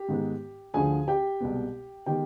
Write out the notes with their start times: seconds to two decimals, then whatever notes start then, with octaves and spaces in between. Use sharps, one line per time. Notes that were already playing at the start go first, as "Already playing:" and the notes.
Already playing: G4
0.08 G#2 D#3 G#3 B3
0.74 D2 D3 F3 G#4 G#5
1.08 G4 G5
1.40 C2 B2 G#3 B3
2.06 D#3 G#3 B3 G4 G5